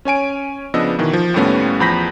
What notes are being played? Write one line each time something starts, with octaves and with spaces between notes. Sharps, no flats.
C#4 C#5 G#5 D7
C#3 F3 B3 D4 D#5 E6
B2 D#3 E3
F3
D#2 A2 G3 A3 B3 C#4
E2 F3 B5 G6 A#6 B6